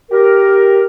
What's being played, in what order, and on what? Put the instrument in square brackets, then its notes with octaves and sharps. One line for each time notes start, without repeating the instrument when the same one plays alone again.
[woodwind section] G4 A#4